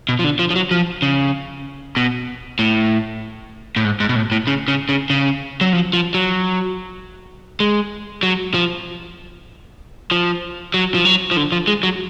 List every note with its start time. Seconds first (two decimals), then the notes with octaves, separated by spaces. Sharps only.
0.09 B2
0.19 F3
0.24 D3
0.39 F3
0.50 F3
0.56 F#3
0.71 F3
1.02 C#3
1.97 B2
2.59 A2
3.76 A2
3.85 G#2
4.00 G#2
4.09 B2
4.16 A2
4.32 A2
4.47 C#3
4.68 C#3
4.89 C#3
5.10 C#3
5.61 F#3
5.73 F3
5.93 F3
6.14 F#3
7.60 G#3
8.23 F#3
8.54 F3
10.11 F3
10.74 F#3
10.94 F3
11.05 F#3
11.31 F3
11.37 D3
11.52 F3
11.68 G#3
11.83 F#3